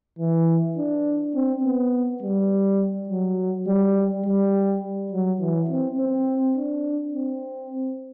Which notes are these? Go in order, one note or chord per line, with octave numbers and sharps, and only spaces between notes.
E3
D4
C4
B3
G3
F#3
G3
G3
F#3
E3
C4
C4
D4
C4